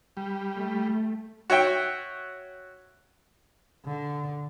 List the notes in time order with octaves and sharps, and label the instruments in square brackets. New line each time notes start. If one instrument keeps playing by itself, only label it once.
[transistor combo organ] G3
[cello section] A3
[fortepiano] F#4 C#5 E5 G5
[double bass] D3